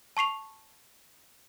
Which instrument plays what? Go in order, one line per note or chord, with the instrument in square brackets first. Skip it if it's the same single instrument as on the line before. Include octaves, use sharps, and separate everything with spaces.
[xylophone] A5 C#6 C7 F7